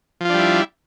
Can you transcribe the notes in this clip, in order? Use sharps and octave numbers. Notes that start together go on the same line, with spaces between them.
F3 G3 D4 E4 F4